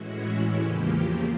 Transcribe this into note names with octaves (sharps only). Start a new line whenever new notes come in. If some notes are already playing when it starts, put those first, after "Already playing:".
Already playing: A2 E3 G#3 C#4 E4 F#4
E2 C#3 F3 A#3 G4